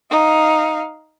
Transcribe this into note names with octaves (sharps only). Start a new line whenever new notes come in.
D#4 F5